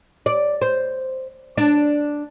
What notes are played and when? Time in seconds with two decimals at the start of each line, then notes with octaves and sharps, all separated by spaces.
0.26 D5
0.62 C5
1.58 D4